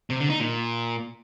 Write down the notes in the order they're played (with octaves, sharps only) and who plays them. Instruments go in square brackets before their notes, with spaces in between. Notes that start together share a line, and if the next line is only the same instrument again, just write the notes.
[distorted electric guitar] C3
D3
D#4
A#2